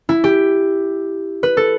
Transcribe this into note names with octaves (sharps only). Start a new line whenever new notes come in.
E4
G4
B4
A4